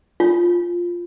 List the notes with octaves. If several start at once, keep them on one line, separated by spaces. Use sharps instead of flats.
F4